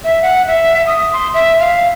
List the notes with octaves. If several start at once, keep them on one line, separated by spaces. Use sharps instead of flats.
E5
F#5
E5
D#6
C6
E5
F5